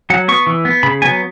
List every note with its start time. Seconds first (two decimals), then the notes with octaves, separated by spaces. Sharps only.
0.10 F#3 F#5
0.28 B3 C#6
0.47 E3
0.65 B3
0.83 C#3 B5
1.02 F#3 B3 G#5